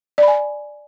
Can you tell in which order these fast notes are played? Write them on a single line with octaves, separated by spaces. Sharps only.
D5 B5 G#5